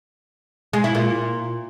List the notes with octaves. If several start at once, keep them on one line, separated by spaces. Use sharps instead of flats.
G#3
E4
A#2